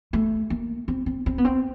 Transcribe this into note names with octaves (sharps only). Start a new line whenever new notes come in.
A3
A#3
C4
C4
C4
B3
C4